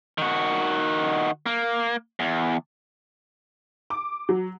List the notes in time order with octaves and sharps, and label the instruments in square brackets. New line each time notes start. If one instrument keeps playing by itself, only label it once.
[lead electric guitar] D#3 F#4
A#3
E2
[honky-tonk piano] D6
F#3